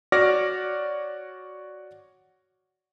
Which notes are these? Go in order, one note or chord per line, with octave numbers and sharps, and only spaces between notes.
F#4 C#5 D5 D6 F6 A#6